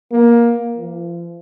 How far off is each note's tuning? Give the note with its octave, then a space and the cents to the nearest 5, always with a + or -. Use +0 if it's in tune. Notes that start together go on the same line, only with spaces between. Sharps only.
A#3 +15
F3 -35